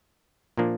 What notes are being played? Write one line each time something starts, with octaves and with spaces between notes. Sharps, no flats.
A#2 F3 A#3 D4